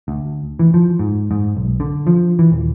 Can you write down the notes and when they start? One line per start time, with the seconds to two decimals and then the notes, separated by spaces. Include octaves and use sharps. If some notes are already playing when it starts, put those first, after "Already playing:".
0.08 D2
0.59 E3
0.74 F3
0.99 G#2
1.31 G#2
1.57 B1
1.80 D3
2.07 F3
2.39 E3
2.52 D#1